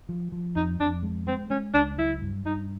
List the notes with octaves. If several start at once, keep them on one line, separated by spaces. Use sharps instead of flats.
F3
F3
F2 D#4
F2 D4
G#3
G#3 C4
G#3 C#4
C#2 D4
F#3 E4
G2
G2 D#4